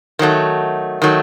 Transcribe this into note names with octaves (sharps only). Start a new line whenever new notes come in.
D#3 F#3 A3
D#3 F#3 A3